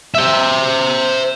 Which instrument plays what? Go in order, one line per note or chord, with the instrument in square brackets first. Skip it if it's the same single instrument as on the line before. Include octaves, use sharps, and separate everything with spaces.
[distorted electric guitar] C5 E5